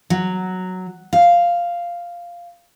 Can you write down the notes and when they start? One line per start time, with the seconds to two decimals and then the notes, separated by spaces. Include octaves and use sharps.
0.10 F#3
1.13 F5